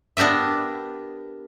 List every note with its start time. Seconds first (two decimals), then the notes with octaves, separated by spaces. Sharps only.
0.17 B3 D4 G4 A#4 E5